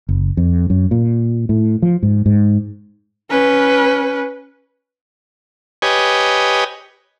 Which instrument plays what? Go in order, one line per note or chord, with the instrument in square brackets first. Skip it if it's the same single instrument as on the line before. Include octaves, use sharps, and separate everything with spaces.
[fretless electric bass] F#1
F2
F#2
A#2
A2
F3
G#2
G#2
[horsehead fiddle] C#4 B4
[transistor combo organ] G4 B4 C#5 D#5 G#5